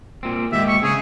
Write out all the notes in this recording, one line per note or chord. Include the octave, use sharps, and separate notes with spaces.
A#2 C4
D#2 G#2 G4 E5
C#6
C#3 G#4